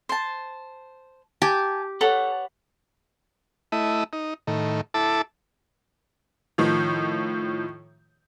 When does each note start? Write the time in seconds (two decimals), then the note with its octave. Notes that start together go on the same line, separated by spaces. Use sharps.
0.09 C5 A5
1.42 G4 G#5 A5
2.01 A4 B4 C#5 F#5
3.72 A3 E4 D#5
4.13 D#4
4.47 A2 D#3
4.94 E4 A4 A5 D6
6.58 A2 D#3 F3